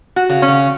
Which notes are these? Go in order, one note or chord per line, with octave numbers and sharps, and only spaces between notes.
F#4
C#3
C#4
C#3